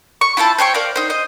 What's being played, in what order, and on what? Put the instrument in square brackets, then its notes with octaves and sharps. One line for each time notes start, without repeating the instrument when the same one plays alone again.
[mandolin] C#6
E4 F4 C5 A5
C5 C#5 G5 C#6
A#4 C5 D5 F5
D#4 C5
C5 D#5